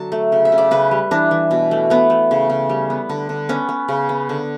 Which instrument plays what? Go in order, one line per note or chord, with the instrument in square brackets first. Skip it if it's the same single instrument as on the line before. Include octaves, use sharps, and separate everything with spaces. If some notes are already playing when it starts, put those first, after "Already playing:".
Already playing: [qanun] D3 F#3 A5
A3
C#3
E5
C#3
D5
C#3 B4
G3
E3 D4
E3
B2
A3
A3 B3
A3
C#3
C#3
G3
B3
D3
D3
B3 C#4
B3
C#3
B3
D3